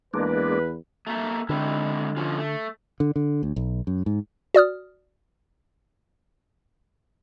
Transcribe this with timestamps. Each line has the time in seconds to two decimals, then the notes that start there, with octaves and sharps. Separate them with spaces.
0.14 E2 G#3 A#3 D4 B4
1.07 A3 A#3 E5
1.49 D3 G#3 C4 E4
2.17 F3 C#4 F4
2.38 A3
3.00 D3
3.16 D3
3.43 D2
3.56 B1
3.87 F#2
4.06 G#2
4.54 F#4 D5 D#6 F6